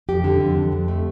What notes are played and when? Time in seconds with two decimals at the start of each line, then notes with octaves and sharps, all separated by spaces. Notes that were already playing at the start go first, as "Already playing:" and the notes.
0.09 F2 G4
0.24 D3
0.40 F2
0.56 F2
0.72 F2
0.88 A3